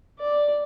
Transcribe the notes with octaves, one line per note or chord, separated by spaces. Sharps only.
D5